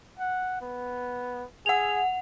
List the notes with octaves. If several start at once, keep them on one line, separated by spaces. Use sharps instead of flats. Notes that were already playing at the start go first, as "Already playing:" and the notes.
F#5
B3
G#4 F#5 F7